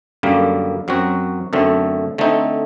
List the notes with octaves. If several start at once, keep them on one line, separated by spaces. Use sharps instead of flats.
F#2 D3 G3 A#3
F#2 F#3 C4 F#4
F#2 D3 A3 C4
D3 A3 C4 D#4